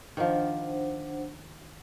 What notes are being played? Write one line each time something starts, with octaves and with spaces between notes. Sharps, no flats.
D#3 F3 D4 C5 F#5